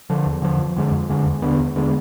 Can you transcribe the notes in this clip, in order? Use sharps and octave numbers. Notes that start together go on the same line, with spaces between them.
D3 F3
E2
D3 F3
F2
D3 G#3
F2
D3 G#3
E2
D3 G#3 B3
E2
D3 G#3 B3